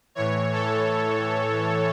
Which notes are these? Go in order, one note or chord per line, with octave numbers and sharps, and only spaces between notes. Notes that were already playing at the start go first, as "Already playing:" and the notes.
A2 E3 C#5
A4